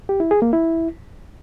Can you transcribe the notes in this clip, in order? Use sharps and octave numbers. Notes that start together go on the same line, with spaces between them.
G4
E4
G#4
A#3
E4